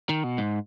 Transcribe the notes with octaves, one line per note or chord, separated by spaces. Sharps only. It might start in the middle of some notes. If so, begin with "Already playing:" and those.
D#3
B2
G#2